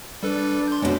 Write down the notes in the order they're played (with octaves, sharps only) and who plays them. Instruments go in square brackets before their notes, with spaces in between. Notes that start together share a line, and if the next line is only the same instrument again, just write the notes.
[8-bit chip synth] G3 A4 B4 [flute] D4
[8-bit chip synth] C6 G6
[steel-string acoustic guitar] B2 C#4 [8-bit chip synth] G#3